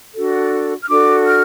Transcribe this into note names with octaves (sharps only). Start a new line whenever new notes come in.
D4 F#4 A4
F6
D4 F#4 A4 D6
F6